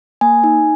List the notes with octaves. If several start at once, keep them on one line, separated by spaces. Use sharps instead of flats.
A#3 G#5
D#4